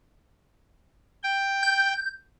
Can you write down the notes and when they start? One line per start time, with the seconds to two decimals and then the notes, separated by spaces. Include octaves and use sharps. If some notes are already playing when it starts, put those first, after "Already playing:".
1.23 G5
1.63 G6